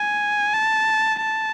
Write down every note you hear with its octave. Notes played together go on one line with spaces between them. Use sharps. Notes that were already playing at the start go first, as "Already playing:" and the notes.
Already playing: G#5
A5
A5